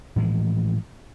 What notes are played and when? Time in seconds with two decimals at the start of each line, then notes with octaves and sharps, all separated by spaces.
0.16 A2 E3 F3 G#3